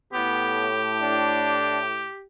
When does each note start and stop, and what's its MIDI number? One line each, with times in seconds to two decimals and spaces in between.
0.13 2.07 45
0.13 0.69 59
0.13 2.24 67
1.02 1.80 62